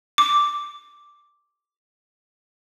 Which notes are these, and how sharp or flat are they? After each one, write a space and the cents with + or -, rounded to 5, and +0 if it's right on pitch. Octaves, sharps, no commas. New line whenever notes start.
D6 +0